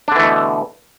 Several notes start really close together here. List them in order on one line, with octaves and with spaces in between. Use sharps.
D4 D3 E3 A3 B2